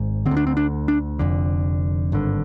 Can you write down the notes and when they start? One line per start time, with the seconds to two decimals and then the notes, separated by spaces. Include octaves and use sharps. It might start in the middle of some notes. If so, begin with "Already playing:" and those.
Already playing: G#1 G#2
0.26 D3 C4
0.31 D2
0.37 D4
0.47 C4
0.57 D4
0.88 D4
1.19 F1 F2 D3
2.12 G#1 G2 D3